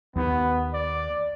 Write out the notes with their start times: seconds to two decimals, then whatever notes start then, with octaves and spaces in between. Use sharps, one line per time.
0.16 D#2 B3
0.74 D5